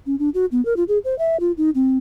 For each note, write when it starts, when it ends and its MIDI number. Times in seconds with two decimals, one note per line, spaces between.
0.06 0.16 61
0.19 0.29 62
0.34 0.46 66
0.52 0.64 59
0.65 0.76 70
0.77 0.84 65
0.88 0.98 68
1.05 1.17 72
1.19 1.39 76
1.40 1.52 65
1.58 1.70 63
1.75 1.98 60